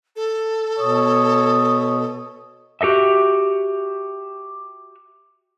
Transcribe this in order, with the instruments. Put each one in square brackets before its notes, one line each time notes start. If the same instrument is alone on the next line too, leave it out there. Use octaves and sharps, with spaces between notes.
[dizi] A4
[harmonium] B2 [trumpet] C#5 [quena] D#6
[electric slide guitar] F#4 G4 A4 D#5 E5